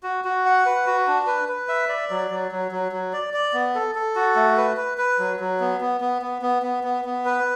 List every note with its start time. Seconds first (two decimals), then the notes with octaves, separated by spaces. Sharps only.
0.03 F#4
0.25 F#4
0.46 F#5
0.66 B4
0.87 F#4
1.07 D4
1.27 B4
1.49 B4
1.69 E5
1.89 D5
2.10 F#3
2.31 F#3
2.52 F#3
2.72 F#3
2.92 F#3
3.13 D5
3.34 D5
3.54 B3
3.75 A4
3.95 A4
4.16 F#4
4.36 A3
4.57 B4
4.77 B4
4.98 B4
5.19 F#3
5.40 F#3
5.60 B3
5.81 B3
6.01 B3
6.22 B3
6.42 B3
6.63 B3
6.84 B3
7.05 B3
7.25 B4